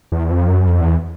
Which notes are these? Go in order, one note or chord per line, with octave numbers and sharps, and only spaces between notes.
E2
F2
F#2
F2
E2